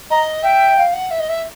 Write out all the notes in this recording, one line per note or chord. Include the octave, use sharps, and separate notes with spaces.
D#5 A#5
E5 G5
F5
F#5
E5
D#5
E5